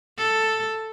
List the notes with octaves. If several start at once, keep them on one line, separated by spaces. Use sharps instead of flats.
A4